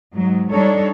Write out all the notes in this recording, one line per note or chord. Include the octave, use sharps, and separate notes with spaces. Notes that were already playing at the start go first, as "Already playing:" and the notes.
G#2 F#3
G3 D4 D#4 A4 C#5